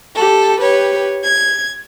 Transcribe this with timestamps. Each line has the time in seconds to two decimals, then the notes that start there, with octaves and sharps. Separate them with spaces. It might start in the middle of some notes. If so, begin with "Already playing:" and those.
0.14 G4 A4
0.59 G4 B4 C#5
1.24 G#6